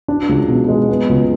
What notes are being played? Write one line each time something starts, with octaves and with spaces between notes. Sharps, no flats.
D4
C#2
B2
G#3
B3
C#2